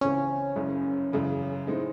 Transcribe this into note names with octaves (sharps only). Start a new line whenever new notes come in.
C#2 C#3 E3 C4 C#4
F#1 F#2 C#3
F#2 C#3 E3
A2 G#3 C4 D#4